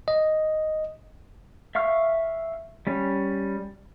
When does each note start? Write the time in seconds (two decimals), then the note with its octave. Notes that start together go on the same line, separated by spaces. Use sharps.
0.08 D#5
1.75 E5 F5 C#6 F6
2.87 G3 C#4